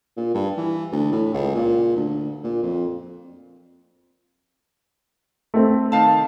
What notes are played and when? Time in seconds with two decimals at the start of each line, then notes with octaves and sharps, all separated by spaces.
0.17 A#2
0.34 G2
0.57 E3
0.93 D2
1.12 A2
1.34 C#2
1.55 A#2
1.96 D2
2.44 A#2
2.63 F2
5.54 A3 C4
5.92 D#3 F5 A5